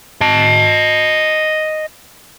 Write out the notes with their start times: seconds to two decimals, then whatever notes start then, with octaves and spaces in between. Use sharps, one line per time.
0.21 D#5 A5